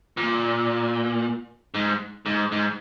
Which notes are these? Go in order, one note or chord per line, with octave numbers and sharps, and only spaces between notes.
A#2
G#2
G#2
G#2